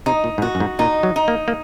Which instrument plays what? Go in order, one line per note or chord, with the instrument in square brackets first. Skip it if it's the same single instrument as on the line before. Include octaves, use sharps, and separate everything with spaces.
[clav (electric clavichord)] C3 [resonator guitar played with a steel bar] D#4
[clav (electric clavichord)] A#2
G#2
[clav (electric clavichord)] A#2 [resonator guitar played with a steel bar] F#4
[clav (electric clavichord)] F#2
G#2
[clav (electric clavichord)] A#2 [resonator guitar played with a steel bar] D#4
[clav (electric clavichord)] F#3
[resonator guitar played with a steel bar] D#4
[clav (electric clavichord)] A#3
A#3